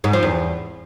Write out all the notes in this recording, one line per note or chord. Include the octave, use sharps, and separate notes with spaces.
G#2
F3
E2